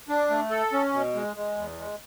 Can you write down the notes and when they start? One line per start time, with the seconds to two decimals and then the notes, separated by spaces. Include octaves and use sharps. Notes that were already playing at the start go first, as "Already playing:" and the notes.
0.09 D4
0.30 A3
0.51 A4
0.73 C#4
0.93 B2
1.15 G#3
1.36 G#3
1.57 E2
1.79 G#3